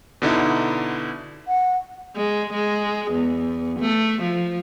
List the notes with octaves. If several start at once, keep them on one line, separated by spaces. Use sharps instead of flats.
B2 D3 D#4 E4
F#5
G#3
G#3
E2
A3
F3